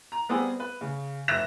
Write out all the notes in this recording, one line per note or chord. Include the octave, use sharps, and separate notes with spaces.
A#5
G3 B3 C4 G#4
B4
C#3
F1 E5 F#6 A#6 E7